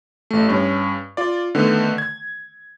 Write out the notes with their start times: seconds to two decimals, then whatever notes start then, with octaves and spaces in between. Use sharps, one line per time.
0.31 A1 A3
0.49 G2 C#4
1.17 F4 D5
1.55 D3 D#3 A3 B3
1.98 G#6